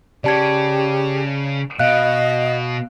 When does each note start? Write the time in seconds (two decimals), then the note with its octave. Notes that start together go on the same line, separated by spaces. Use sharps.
0.24 C#3 G4 D5 A5 G#6
1.79 B2 D#5 F5 F#6